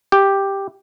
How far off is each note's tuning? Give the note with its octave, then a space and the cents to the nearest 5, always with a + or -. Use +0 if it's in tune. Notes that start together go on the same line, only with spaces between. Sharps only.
G4 +5